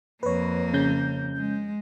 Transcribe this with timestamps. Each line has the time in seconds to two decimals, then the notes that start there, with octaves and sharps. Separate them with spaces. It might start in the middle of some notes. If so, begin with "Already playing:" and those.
0.23 F2 A#3 B4 C#5
0.73 C#3 C#4 G6
1.37 G#3